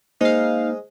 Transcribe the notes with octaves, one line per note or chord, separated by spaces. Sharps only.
G#3 A#3 D#4 C5 F5 D#6